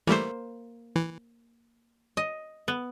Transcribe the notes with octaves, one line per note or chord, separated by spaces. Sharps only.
E3 G3 A3 A#3 C5
E3
D#5
B3